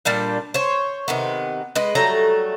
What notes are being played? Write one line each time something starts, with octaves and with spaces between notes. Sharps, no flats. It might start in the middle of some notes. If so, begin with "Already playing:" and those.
A#2 G3 D4 G5
C5 C#5
C3 D#3 B3
G#3 B4 D#5
F#3 G3 A3 A#5